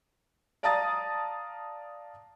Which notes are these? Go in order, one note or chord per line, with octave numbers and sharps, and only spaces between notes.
D5 F5 A5 A#5 D#6 A6